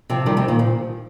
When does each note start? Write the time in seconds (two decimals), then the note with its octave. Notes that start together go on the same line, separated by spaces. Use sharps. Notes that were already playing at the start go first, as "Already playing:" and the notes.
0.10 C3 F3
0.26 D#3 G3
0.37 C3 F3
0.48 A#2 D#3
0.59 F3